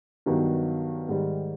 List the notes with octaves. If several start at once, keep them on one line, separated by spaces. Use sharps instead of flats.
G2 D#3 F#3 B3 D#4
G#2 D#3 G3